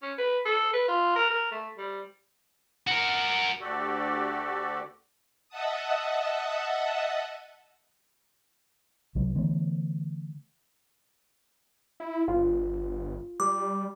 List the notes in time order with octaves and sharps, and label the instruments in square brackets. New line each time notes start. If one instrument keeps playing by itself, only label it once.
[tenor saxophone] C#4
B4
A4
B4
F4
A#4
A#4
A3
G3
[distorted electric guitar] F#4 A#4
[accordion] D2 F#4 G4 A4 D5
[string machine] D#5 E5 F#5 A5 D#6
[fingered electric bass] C2 F#3
D3 E3 A3 B3
[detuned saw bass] E4
[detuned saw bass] G1 [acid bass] F4
[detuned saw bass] G3 [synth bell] D6